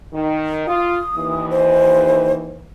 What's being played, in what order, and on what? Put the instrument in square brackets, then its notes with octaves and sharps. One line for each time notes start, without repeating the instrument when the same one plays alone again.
[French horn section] D#3
[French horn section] F4 [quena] D#6
[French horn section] D#2 E3
[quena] C5